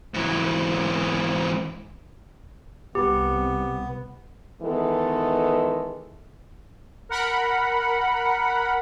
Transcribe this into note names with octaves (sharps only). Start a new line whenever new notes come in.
G#2 E3
C2 B3 G4
D#3 E3 G#3 B3 A4
A#4 F#5 B5